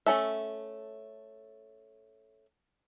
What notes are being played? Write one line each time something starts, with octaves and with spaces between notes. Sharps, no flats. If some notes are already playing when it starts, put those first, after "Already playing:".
A3 C#4 A4 E5